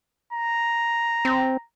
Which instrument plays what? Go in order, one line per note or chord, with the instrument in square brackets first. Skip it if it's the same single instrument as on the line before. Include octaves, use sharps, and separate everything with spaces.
[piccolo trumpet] A#5
[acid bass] C4